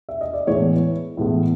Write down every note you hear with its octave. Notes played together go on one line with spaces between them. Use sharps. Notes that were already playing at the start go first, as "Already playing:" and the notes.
E5
D#5
D5
A2 E3 G#3 B3 E4 C#5
A2 E3 G#3 B3 E4